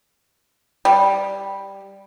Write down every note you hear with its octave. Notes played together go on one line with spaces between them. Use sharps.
G3